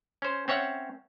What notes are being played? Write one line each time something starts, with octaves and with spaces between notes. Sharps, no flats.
C#4 C5
C4 C#4 C#5 E5 F#5